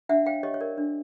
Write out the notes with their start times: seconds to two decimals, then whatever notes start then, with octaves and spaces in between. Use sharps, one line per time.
0.09 D4 E5 F#5
0.26 C#5 F5 G5
0.43 G4 C#5 D#5
0.54 C#5
0.61 A#4 D5
0.78 D4